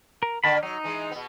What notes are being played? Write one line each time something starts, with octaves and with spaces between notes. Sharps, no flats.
A#4
D3 A#3 A5 B5
F#3 D#4
E3 G#3
B2 B3